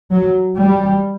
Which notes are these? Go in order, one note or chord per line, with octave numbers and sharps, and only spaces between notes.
F#3
G3